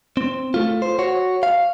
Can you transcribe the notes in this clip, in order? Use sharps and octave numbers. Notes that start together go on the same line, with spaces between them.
C4
A3 F4
C5
F#4 C#5
F5